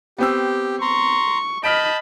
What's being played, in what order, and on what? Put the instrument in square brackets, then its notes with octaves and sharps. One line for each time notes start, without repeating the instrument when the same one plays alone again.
[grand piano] B3 C4 E6 [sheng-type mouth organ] G4
[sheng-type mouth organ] A#5 C6 [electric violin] C#6
[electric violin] D#5 B5 [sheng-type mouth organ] A5 G6 [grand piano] F6 B6 D7